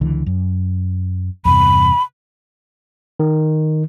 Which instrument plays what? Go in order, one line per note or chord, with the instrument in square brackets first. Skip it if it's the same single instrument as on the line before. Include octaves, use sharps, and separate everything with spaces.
[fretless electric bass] C#2 D3 E3
F#2
[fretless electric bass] E2 G2 C3 [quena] B5
[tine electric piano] D#3